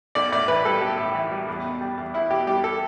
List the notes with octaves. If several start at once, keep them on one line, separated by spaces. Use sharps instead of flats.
B1 D5
A2 D5
E3 B4
G3 A4
B1 G4
A2
E3
G3
E2
B2
G3
E2
E2 E4
B2 G4
G3 G4
A4